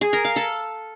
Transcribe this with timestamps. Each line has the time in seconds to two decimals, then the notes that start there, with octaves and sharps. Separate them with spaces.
0.01 G#4
0.13 A#4
0.25 F5
0.36 A4